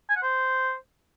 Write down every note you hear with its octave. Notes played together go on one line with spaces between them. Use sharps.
G#5
F#5
C5